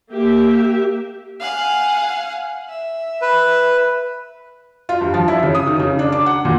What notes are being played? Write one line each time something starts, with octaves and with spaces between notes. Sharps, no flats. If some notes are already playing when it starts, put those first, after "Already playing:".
A#3 G4 E5
F5 F#5 G#5
E5
B4
F4
G2
F3
E4
C#3
D#6
D#3
C#3
D4
D6
F#5
A#2